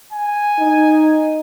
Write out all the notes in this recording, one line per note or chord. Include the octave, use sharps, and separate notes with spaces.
G#5
D#4